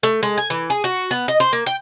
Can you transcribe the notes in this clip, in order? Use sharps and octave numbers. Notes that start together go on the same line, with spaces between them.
A3
G#3
G#5
E3
G#4
F#4
B3
D#5
C5
A#3
G5